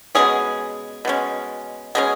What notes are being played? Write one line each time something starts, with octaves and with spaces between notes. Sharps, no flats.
B2 G#3 C#4 G#4
B2 G#3 C#4
B2 G#3 C#4 G#4